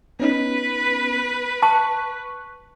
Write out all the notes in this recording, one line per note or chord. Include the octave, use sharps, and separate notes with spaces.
B3 C#4 D#4 B4
A5 C#6 F#6